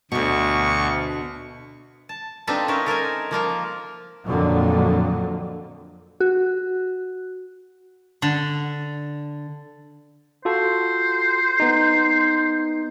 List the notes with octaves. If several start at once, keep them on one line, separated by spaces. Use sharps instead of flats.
D2 B2 D3 C#6
A5
C4 D4 D#4 F4 A4 B4
C#4 D#4 A#4 B4 E5
A4 A#4 C5 G#5
F3 A#3 F4 A#4
F2 A#2 D3 F#3
F#4
D3
F4 F#4 A4 C5
B3 D#4